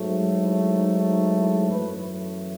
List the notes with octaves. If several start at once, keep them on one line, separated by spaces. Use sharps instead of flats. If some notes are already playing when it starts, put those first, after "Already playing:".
Already playing: G#2 F#3 A3
E4
D#4
D#4
E4
F#2 E3 A3 B4